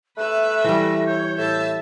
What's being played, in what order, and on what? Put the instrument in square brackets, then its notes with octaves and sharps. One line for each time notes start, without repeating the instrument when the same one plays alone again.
[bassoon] A3 [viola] B4 E5 [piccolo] F#6
[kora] E3 G3 [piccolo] A#6
[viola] C#5 [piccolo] G6
[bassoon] A2 [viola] E5 A5